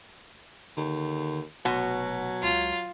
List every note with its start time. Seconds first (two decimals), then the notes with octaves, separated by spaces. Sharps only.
0.77 D#2 D3
1.65 F1 B2 F#3
2.43 C#2 F4